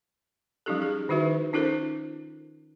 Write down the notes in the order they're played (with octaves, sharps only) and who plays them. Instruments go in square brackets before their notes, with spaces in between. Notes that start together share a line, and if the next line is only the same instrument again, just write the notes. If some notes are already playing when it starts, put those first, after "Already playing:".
[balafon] F3 G3 C#4 D#4 G4 A4
G#4
D#3 D#4 E4 F#4 B4 E5
C#4 D#4 F4 A4 A#4 C5